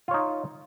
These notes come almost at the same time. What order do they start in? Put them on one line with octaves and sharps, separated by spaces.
F4 C#5 D#4